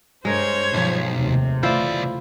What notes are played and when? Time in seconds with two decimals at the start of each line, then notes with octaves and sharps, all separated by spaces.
0.25 G2 G#3 A#4 C5 C#5 G#6
0.73 B1 F3
1.17 F1 D#2 C3
1.63 C2 C#3 E3 A3 E4 F4 C5 D5